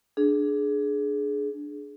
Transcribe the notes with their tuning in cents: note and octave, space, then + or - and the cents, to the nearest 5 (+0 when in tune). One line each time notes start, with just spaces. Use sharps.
D4 +5 G#4 +20